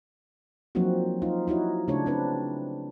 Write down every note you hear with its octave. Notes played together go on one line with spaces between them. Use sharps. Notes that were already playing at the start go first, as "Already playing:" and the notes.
F3 F#3 A#3 C4 D#4 F#4
D#4 F4
D#4 E4 F#4 C#5
C#3 A3 D4 C#5
C4 D4 B4